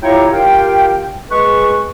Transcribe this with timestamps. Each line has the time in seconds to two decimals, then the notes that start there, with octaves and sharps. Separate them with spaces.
0.02 E4 F4 G4 C#5 G5 A#5
0.31 F4 G4 A#4 F5 G5
1.31 G#3 B4 C#6